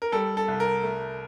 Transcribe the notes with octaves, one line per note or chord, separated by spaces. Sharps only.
A#4
G3 A4
A4
C2
A#4
A3